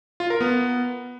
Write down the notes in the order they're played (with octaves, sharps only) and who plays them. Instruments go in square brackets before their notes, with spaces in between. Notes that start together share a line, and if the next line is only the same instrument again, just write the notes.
[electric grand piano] F4
A#4
B3